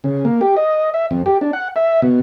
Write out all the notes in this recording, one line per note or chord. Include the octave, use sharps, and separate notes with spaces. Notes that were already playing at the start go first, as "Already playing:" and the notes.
C#3
A#3
G4
D#5
E5
F2
G4
D4
F#5
E5
B2